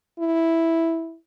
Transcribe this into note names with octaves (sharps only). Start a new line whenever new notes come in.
E4